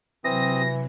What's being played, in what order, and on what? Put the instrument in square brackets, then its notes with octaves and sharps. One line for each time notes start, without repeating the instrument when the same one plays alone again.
[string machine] C3 F#3 [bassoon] E3 [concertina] C4 D#6 [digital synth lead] A#6